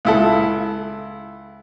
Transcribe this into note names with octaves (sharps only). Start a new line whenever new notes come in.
C#2 E4 A4